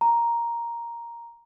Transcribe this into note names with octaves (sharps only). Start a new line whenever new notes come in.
A#5